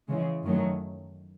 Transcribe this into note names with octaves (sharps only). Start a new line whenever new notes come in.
C#3 E3 G#3
F#2 D#3 F#3 A3